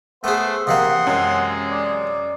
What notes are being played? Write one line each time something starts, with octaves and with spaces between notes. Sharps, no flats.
A3 B3 G#4 C5 F#5 C6
C3 E3 A#3 D#5 F#5 C6
F#2 G#3
D5